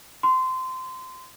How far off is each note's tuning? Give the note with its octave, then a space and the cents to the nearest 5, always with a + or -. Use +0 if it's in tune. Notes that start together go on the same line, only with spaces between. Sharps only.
C6 -20